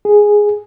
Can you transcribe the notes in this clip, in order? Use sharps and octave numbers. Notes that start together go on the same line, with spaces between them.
G#4